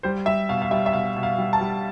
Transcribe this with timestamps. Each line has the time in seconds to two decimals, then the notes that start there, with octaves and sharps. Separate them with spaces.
0.03 G3 C5
0.26 G3 E5
0.49 B2 F5
0.62 F5
0.71 G3 E5
0.86 E5
0.93 B2 F5
1.16 B2
1.23 F5
1.38 G3
1.53 A5
1.61 G3